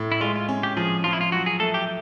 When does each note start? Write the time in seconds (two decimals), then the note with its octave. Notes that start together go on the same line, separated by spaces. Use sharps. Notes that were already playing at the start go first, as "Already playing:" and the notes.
Already playing: A2
0.12 E4
0.21 G#3 F4
0.36 F4
0.49 C#4
0.63 G4
0.77 F3 G#4
1.04 F3 F4
1.13 E4
1.21 F4
1.32 F#3 F#4
1.46 G#4
1.60 A3 A4
1.74 G4